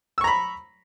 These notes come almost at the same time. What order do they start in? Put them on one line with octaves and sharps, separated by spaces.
E6 C#6 A#5 B5